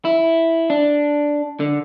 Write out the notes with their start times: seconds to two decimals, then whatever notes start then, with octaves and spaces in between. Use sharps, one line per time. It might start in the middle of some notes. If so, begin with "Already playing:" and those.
0.05 E4
0.70 D4
1.60 D3